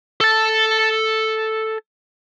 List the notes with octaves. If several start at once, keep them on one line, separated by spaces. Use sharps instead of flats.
A4 A5